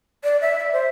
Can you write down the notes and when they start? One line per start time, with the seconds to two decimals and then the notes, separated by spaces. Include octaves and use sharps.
0.24 D5
0.41 E5
0.59 E5
0.73 C5